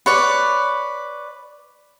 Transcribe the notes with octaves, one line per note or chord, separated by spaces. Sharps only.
B4 C#5 D5